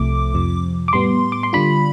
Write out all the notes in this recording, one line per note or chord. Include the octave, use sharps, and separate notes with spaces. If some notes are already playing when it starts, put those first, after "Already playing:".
Already playing: C2 C3 F3 A3 D6
F2 C3 F3
D6
A2 G3 B3 C6
D6
C6
D3 G3 D4 F4 B5